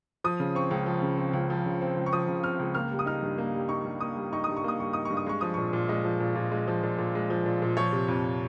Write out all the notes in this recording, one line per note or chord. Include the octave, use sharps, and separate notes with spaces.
F3 D#6
C#3
C4 C#6
C#2
F3
C#3
C4
C#2
F3
C#3
C4
C#2
C#6
F3 D#6
C#3
C4 F6
C#2
A#3 F6
G3
D#6
D#4 F6
G2
A#3
G3
D#4 C#6
G2
A#3 D#6
G3
D#4 C#6
G2 D#6
C#6
A#3 D#6
G3 C#6
D#4 D#6
C#6
G2
D#6
G#3 C#6
F3 D#6
A#2 C#6
A#2
G#3 D#5
F3
A#2
A#2
G#3
F3
A#2
A#2
G#3
F3
A#2
A#2
F3 C#5
C3
F2